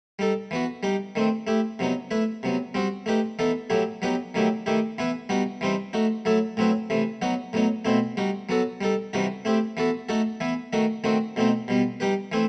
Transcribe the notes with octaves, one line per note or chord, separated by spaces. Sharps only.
G3 D#4 A4
E3 B3 F#4
G3 D#4 G4
D#3 A3 C4
A3 E4 G4
C3 F#3 B3 D#4
A3 E4 B4
C3 F#3 B3
G3 C4 F#4
A3 D#4 G4 B4
E3 B3 D#4 A4
A2 F#3 A3 E4 G4
F#3 B3 D#4 G4 B4
D#3 F#3 A3 E4 G4
D#3 A3 E4 G4
E3 B3 E4 B4
G3 B3 D#4 F#4
E3 G3 C4 D#4
A3 D#4 F#4
F#3 A3 E4 A4
A2 F#3 C4 E4 B4
C3 E3 A3
F#3 B3 D#4 F#4
A2 F#3 B3 D#4
B2 A3 C4 E4
G3 D#4 F#4
F#3 B3 F#4 A4
G3 D#4 A4
C3 E3 G3 D#4 F#4
A3 C4 E4 G4
E3 B3 F#4 A4
A3 D#4 F#4 A4
E3 B3 E4
D#3 A3 D#4 F#4
D#3 A3 C4 F#4
B2 A3 C4 D#4
B2 G3 B3
G3 D#4 G4 B4
E3 A3 C4 E4